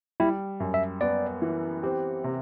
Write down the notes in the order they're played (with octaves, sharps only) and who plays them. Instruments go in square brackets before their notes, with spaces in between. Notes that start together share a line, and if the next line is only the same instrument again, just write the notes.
[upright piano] G3 [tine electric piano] E4
[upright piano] F#2
[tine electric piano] E5
[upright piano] B3 [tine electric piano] D5
[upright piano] E3
[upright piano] C4 [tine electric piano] G4
[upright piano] C3